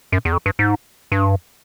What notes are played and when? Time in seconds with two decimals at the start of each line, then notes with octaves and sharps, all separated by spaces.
0.12 F#2
0.25 E2
0.33 F2
0.46 G2
0.59 G#2
1.12 G2